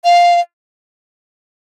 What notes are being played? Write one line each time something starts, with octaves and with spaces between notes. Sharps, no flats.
F5